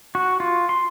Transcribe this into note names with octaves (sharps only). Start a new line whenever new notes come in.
F#4
F4
C6